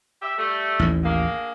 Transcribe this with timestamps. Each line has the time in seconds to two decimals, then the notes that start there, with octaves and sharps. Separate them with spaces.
0.22 G4 E5
0.38 G3 A3
0.79 A1 D#2 A2
1.04 D3 G#3 A#3